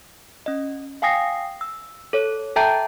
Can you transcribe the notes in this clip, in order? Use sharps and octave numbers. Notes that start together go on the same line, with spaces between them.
C#4 D#5
F5 G5 G#5 D#6 A#6 C7
E6
A4 C#5
A4 E5 G5 A5 A#5 G6